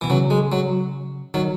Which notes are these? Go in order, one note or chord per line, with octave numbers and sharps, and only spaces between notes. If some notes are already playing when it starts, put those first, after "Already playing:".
B2 E3
C#3 F#3
G#3
F#3
D#3 F#3